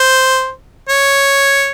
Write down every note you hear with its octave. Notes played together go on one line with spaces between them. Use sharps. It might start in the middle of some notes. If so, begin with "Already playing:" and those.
Already playing: C5
C#5